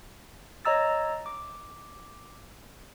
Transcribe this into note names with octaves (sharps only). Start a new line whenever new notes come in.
C#5 D#5 A#5 E6 A6
D6